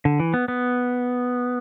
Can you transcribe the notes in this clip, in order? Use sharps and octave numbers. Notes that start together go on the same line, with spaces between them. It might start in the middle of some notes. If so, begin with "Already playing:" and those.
D3
E3
B3
B3